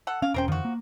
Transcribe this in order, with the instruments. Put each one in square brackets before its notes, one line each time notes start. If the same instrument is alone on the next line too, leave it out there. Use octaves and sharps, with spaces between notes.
[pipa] A4 F#5
[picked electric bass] C#4 [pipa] F5
[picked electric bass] E1 C#4 [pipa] A#4 C5 G5
[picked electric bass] F2 D3 D#3 [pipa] F3 F#4
[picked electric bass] A#3